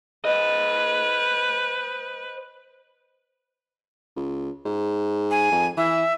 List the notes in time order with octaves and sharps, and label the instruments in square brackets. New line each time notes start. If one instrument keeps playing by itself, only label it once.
[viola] B4 [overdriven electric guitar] C5 D#5
[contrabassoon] C#2
G#2
[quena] G#5
[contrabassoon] F2
[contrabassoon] E3 [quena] E5